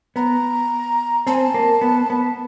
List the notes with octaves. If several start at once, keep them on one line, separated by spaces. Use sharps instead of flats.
B3 A#5
C4 A5
G#5
A5
A#3
B3
B3